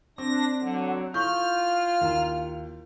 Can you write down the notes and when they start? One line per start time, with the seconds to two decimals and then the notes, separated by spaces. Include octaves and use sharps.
0.18 C4 D4 D6 A#6
0.62 D3 F#3
1.14 E4 F4 A4 C#6 F6 G6
2.01 D#2 E4 A#5